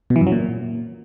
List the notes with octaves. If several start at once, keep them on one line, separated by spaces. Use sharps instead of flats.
B2
E3
F#2
F#3
A#2